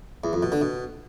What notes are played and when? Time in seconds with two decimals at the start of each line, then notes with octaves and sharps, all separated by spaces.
0.24 E2
0.33 F2
0.43 B2
0.52 D3
0.61 B2